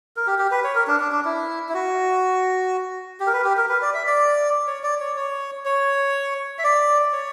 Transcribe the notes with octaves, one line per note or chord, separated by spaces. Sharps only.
A#4
G4
G4
B4
C#5
A#4
D4
D4
D4
E4
E4
F#4
G4
A#4
B4
G4
A#4
B4
D5
E5
D5
C#5
D5
C#5
C#5
C#5
E5
D5
C#5